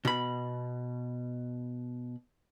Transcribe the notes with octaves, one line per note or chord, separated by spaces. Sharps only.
B2 B5